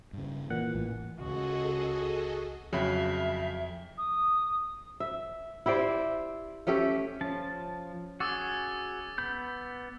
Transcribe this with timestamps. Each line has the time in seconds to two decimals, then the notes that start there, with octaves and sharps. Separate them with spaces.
0.13 G2 C#3
0.50 A#2 E3 F#5
0.75 A1
1.19 C#2 F#4 G#4 A4 D#5
2.73 F2 C#3 F#3 E5 B5
3.98 D#6
5.00 E5
5.66 E4 G4 C5 D5
6.67 A3 C#4 G4 A4
7.21 F3 C#4 C#5 A5
8.20 F#4 G#4 G#5 D6 E6 A6
9.18 B3 B5 G6